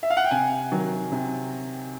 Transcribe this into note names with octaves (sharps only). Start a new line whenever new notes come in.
E5
F5
F#5
G5
C3 G#5
D#3 F#3
C3